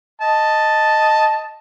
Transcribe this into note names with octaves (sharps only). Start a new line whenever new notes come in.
D#5 A5